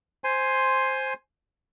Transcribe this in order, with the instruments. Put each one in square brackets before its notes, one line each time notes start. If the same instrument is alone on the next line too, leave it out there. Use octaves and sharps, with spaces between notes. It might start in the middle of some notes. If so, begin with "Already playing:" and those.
[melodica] C5 G#5 C6